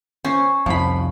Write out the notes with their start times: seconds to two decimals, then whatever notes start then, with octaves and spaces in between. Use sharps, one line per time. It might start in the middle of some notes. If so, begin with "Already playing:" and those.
0.25 C#4 C5
0.66 C2 F2 F3 B5